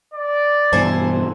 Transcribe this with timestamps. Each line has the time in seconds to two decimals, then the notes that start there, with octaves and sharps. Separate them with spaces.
0.13 D5
0.73 G2 B2 E3 A4 C5 G#5